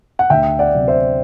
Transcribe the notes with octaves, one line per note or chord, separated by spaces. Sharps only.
F#5
D2 E5 G5
D5 F#5
C3 F#3
C5 E5